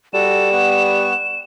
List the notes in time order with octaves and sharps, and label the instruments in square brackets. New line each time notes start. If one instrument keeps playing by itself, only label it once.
[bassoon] G3 [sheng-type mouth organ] F#4 A4 [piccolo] E7
[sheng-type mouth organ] B3 F#5 C#6